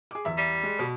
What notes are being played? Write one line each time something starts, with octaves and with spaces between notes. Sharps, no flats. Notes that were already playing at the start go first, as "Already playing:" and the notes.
G#4 D6
E2 E5
G3
G#3
B2